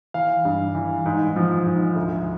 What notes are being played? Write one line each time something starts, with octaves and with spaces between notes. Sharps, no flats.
E3 F5
G2
E3
G#2
F3
G#2
D2